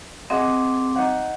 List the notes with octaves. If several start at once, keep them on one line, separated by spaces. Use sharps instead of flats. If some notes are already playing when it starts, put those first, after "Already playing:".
C4 G#4 D#5 F#5 D6
D#4 F#5